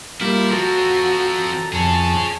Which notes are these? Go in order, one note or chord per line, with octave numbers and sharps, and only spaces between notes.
G3 A#3 E4 F4
F3 C4 F#4 A4 A#5
F2 G#4 C#5 A5